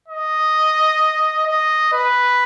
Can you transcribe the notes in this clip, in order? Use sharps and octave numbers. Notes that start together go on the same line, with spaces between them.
D#5
D#5
B4